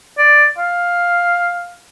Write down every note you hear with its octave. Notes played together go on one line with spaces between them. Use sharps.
D5
F5